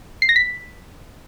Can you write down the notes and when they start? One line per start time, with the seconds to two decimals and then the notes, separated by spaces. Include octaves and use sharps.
0.22 C7
0.29 A#6
0.36 B6